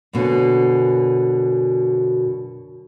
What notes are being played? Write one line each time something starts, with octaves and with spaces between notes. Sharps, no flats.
F#2 B2 D3